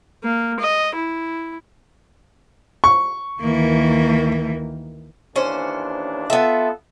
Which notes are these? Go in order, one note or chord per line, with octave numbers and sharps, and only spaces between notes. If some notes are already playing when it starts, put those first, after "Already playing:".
A#3
D#5
E4
C#6
D2 D#3 E3 A#3
D#2 E3 C#4 D4 C5
B3 F4 A4 E5